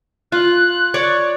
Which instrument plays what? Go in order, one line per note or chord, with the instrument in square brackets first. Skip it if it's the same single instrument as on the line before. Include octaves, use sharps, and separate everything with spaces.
[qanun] F4 [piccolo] F#6
[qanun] C#5 D5